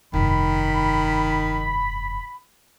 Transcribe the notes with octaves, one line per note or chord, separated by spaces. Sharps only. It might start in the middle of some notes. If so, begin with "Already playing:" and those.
F1 G2 D#3 B5